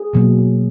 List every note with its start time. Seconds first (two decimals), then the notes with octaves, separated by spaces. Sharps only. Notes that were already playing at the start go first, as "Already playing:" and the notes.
Already playing: G#4
0.13 B2 F#3 A#3